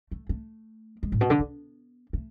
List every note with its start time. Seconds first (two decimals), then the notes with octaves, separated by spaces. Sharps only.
0.11 A3
0.29 A3
1.03 G#3
1.12 A2
1.21 B2
1.30 D3
1.39 B3
2.13 A3